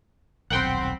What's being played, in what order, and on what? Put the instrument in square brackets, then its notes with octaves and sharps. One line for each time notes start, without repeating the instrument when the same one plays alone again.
[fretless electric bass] D#1 B1 [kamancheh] C4 B5 [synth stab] F#5 G5 C6